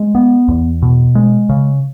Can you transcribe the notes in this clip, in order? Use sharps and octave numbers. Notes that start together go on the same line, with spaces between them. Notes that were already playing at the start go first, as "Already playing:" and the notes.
Already playing: G#3
B3
E2
B2
G#3
C#3